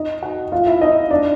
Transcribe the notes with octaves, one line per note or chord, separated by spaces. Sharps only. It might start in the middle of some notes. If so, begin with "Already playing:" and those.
Already playing: D#4 D#5
F#4 F#5
F4 F5
E4 E5
D#4 D#5
D4 D5